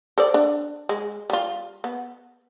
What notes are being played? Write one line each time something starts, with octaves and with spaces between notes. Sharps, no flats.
A4 C5 D5
D4
G#3
G3 F4
B3